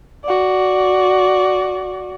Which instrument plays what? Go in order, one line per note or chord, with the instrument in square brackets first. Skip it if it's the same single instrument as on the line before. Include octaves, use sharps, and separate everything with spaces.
[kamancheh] F#4 D5